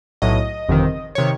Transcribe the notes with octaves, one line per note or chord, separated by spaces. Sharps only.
B1 A2 F#3 D#5
G1 F2 C3 D#3
C3 D#3 C#5